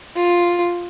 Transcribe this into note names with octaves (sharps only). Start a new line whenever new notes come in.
F4